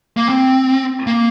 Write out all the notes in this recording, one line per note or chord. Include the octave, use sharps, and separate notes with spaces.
A#3
C4
A#3